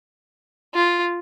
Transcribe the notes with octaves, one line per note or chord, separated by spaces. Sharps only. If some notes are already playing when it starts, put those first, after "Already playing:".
F4